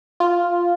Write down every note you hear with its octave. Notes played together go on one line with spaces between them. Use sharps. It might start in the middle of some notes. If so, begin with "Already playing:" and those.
F4